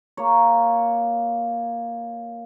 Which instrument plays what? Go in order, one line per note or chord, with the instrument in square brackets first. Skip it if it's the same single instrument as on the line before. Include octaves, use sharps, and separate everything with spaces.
[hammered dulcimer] A#3 C#5